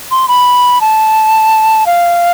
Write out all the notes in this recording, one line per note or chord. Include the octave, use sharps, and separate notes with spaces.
C6
B5
A5
F5